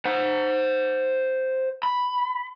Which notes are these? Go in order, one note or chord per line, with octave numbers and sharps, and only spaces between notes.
C5 F#5
B5